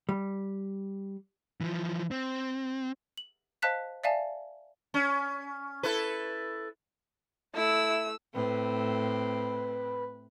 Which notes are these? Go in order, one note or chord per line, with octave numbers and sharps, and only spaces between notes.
G3
E3 F3
C4
F#7
C5 D#5 F5 A5 F#6 B6
D5 E5 F5 G#5 A5
C#4
E4 A4 B4
A3 E4 E6
A2 C4 B4